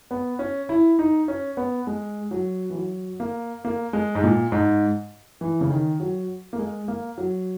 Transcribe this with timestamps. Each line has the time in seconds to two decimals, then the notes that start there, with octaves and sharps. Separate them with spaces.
0.11 B3
0.39 C#4
0.69 E4
0.99 D#4
1.28 C#4
1.57 B3
1.87 G#3
2.31 F#3
2.70 E3
2.75 F#3
3.20 A#3
3.65 A#3
3.93 G#3
4.15 G#2
4.23 A#2
4.52 G#2
5.41 E3
5.61 C#3
5.70 D#3
6.00 F#3
6.53 A#3
6.59 G#3
6.88 A#3
7.18 F#3